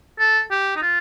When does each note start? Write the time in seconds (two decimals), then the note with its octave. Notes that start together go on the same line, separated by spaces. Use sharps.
0.19 A4
0.51 G4
0.76 D#4
0.82 F4